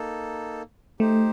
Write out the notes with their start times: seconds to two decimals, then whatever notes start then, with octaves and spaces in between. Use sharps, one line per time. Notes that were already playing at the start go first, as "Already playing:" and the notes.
Already playing: A#3 D#4 A4
1.00 A3 D#4 G4 C5